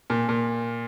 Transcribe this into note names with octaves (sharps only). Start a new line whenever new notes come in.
A#2
A#2